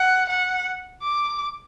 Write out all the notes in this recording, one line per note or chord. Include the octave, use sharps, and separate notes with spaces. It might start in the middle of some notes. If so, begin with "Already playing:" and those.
Already playing: F#5
F#5
D6